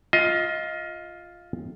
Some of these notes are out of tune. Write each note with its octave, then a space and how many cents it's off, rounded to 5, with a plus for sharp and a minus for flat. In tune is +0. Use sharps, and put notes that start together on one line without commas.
F4 +5 D#5 +25